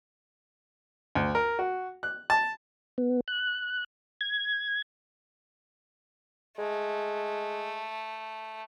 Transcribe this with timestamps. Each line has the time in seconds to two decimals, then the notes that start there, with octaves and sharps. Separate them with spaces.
1.15 D2
1.35 A#4
1.59 F#4
2.03 F#6
2.30 A5
2.98 B3
3.28 F#6
4.21 G#6
6.58 G#3 A3